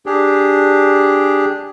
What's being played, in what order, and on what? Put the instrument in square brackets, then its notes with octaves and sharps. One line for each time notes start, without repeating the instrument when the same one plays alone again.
[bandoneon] D4 G4 G#4